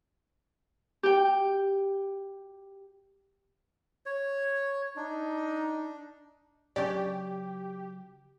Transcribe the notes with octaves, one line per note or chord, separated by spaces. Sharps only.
G4 G5
C#5
D4 D#4
C#3 F#3 C#4 D4 G4 D5